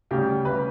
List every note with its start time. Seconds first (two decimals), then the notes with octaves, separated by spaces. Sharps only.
0.11 D2 C#3 G3 G4
0.45 D2 C#3 G3 B4